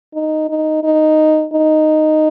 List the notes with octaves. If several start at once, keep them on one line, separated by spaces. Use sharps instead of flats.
D#4
D#4
D#4
D#4